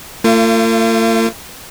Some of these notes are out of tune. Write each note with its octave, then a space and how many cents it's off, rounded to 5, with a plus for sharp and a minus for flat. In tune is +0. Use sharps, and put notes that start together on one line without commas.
A3 +45 F4 -30